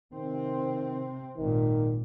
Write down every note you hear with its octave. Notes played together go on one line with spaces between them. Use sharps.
C3 D#3 C4
G#1 A#2 D#3